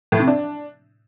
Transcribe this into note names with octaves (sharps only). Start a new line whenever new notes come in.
A2
C3
D4